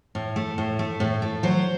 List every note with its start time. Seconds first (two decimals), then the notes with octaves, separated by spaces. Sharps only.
0.15 A2
0.36 A3
0.58 A2
0.79 A3
1.00 A2
1.22 A3
1.43 F#3 C5